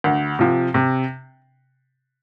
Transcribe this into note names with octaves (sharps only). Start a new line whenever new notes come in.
D2
C3 F3
C3